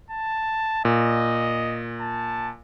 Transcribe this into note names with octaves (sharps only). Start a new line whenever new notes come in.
A5
A#2 D#5
A5